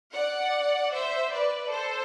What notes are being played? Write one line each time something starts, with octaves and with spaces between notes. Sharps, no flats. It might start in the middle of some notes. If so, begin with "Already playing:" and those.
D5 F#5
C5 E5
B4 D5
A4 C5